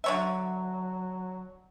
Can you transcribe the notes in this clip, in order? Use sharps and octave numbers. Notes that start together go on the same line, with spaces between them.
D3 F#3 C#5 E5